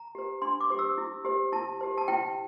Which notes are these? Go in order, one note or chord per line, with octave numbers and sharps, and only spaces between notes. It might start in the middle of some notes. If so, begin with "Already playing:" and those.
Already playing: A#5
G4 C5
D4 C6
D6
G4 C5
E6
E4
G4 C5
E4 A5
G4 C5
A5
E4 G5